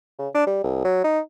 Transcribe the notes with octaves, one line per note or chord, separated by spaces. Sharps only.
C#3
D4
G3
C2
F#3
D#4